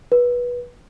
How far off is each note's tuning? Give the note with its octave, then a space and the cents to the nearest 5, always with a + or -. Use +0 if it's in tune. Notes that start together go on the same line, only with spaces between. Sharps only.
B4 -20